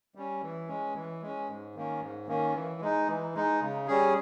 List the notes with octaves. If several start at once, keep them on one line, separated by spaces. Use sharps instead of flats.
G3 C#4
E3
G#3 C#4
E3
G#3 C#4
G#2
D#3 A#3 C#4
G#2
D#3 A#3 C#4
E3
G#3 D#4
E3
G#3 D#4
C#3
G3 C#4 G#4